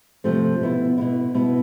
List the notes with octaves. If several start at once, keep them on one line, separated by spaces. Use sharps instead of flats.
C3 F3 A3 C4
B2 B3 E4
B2 B3 E4
B2 B3 E4